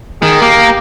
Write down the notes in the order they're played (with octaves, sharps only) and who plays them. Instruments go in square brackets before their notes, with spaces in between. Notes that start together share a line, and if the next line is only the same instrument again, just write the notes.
[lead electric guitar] D#3 [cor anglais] G#4
[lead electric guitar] A#3 [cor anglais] G4